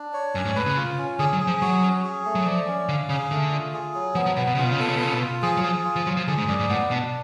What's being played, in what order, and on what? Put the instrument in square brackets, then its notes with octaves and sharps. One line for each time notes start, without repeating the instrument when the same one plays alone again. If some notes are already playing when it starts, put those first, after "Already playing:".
Already playing: [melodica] D4
C#5
[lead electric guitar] F#2 [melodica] C#4
[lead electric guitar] G#2
[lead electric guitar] A2 [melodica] B4
[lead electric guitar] C#3
[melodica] F4
C#4
[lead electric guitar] D3 [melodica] G#4
[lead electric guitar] F#3
[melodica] G#4
[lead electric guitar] F3
[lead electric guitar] F#3 [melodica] F#4
[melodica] C#4
G#4
A3
[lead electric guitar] F#3
[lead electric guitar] F3 [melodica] D5
[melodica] C#4
[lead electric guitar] D3 [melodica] F5
[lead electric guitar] C#3 [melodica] G#4
[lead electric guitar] D3 [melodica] A3
[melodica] F4
G#4
F#3
[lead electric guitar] F3 [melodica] B3
[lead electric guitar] F3
[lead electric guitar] B2 [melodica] B3
[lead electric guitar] B2
[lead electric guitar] C#3 [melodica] F4
[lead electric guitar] B2
C#3
[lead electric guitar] B2 [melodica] A4
[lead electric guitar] C#3
B2
[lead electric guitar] C#3 [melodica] F4
[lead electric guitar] B2
[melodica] F4
[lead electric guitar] F3 [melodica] G#4
[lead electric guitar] F#3
[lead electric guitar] F3 [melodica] G#4
[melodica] F4
[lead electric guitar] F3
[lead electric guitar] F#3 [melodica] F4
[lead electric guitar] F3
[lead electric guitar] D3 [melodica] G#4
[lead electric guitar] G#2
[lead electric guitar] F#2 [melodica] D5
[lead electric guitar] G#2
[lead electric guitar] A2 [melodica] B3
[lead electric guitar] B2 [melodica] D4